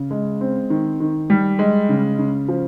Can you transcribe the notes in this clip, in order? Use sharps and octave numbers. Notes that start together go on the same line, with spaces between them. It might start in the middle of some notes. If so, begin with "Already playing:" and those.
Already playing: C#3
G#3
C4
D#3
D#3
G3
G#3
C#3
C#3
F3